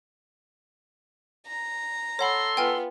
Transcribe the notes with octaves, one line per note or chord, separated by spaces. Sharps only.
A#5
A4 C#5 F#5 B5 C6
B3 F4 G5 G#5 F6